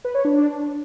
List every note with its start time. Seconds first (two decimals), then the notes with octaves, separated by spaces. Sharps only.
0.05 B4
0.15 C#5
0.25 D4